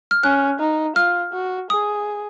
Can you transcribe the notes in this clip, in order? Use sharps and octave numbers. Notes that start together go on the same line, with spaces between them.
F6
C#4 F#6
D#4
F4 F6
F#4
G#4 D#6